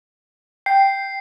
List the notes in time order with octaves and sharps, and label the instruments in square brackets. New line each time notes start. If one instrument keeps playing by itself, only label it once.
[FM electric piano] G5 [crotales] C7